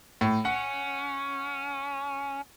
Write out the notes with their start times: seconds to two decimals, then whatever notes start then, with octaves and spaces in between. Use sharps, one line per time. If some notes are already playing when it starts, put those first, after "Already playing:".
0.21 A2
0.45 C#4 F#5